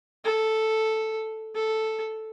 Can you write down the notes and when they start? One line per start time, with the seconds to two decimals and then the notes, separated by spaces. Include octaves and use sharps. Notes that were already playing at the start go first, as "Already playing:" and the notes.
0.24 A4
1.55 A4